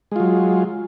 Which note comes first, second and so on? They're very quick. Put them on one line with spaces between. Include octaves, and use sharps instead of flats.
G#3 F4 F#3